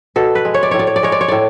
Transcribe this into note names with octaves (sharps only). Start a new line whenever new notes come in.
B2 A4
B4
G#3
C#5
D5
A2 C#5
D5
C#5
D5
G#3 C#5
D5
C#5
A2 D5